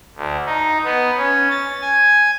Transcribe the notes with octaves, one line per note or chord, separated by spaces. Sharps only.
D2
D#4
B3
C#4
A6
G#5